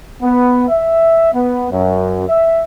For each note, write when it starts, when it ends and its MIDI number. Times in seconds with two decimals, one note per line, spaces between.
0.22 0.63 59
0.69 1.33 76
1.33 1.66 59
1.71 2.26 42
2.28 2.61 76